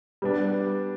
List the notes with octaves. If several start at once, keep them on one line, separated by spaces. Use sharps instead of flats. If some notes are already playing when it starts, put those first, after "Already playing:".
G3 B3 D4